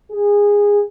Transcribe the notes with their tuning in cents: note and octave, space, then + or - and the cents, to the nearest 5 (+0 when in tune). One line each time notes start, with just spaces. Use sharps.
G#4 -20